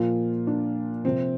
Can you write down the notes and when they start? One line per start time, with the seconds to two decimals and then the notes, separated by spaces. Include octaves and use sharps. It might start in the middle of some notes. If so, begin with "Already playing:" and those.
Already playing: A#2 F3 F4
0.47 D4
1.04 C3 F3 C4